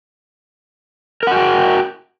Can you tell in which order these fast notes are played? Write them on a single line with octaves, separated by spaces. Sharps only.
A#4 F#5 F#4 G5